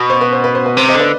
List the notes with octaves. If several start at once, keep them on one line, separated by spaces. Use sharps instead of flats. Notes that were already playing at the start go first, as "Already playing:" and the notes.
Already playing: B2
C5
B4
C5
B4
C5
B4
C3 C5
C5 D#5
D3
B4 D5